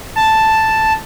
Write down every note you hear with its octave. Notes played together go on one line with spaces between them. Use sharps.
A5